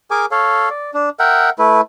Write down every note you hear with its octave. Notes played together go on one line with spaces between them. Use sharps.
G#4 A#4 G#5 D6
A4 C#5 F5
D5
D4
A#4 E5 F#5 G5
A3 E4 B4